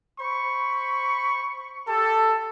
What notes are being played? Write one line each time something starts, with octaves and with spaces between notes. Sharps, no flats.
C5 B5 C#6
G4 A4